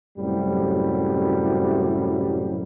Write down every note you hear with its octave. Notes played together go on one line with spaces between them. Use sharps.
F#2 A2 C3 F#3 G3